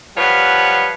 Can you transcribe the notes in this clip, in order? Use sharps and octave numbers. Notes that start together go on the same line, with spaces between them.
F3 G3 B4 C#5 F5 F#5